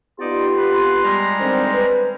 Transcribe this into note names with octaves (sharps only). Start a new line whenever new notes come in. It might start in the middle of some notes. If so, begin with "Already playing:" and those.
B3 D#4 F4 G4 D5 C6
B4
G3 G#3 A#5
D3 D#3 C4
B4